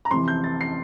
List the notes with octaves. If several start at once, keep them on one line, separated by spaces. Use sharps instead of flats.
A#5
F2 C3 E3 C6
G6
A6
C7